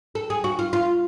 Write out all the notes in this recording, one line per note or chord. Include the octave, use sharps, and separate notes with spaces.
A4
G#4
F#4
F4
F4